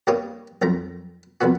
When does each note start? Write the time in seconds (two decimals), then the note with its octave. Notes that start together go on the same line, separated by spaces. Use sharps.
0.07 G2 G3 A#3 G4 C#5 D#6
0.62 B1 F2 A3 A#5
1.41 C2 F2 B2 B3 F#4